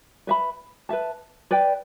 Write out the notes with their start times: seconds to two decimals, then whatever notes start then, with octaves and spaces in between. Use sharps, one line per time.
0.27 B4 E5 B5
0.89 B4 E5 A5
1.51 B4 D5 G5